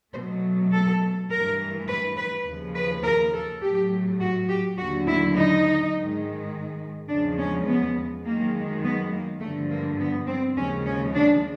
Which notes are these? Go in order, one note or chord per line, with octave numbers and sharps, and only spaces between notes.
B2 F#3 A3 C5
A4
G2 E3 A3 A#4
B4
B4
D#2 C#3 F3
B4
A#4
A4
A2 F#3 A3 G4
F#4
G4
D#2 D3 F#3 A3 F#4
E4
D#4
G#2 D#3 G#3
E2 C#3 F3 G#3 D4
C#4
B3
F#2 D#3 G#3 A#3
B3
A#3
G2 D3 F3 A3
A#3
B3
C4
D#2 C#3 F3 G#3 C#4
C#4
D4